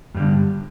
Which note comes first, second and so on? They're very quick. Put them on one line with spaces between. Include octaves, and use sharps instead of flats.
G2 G3 D3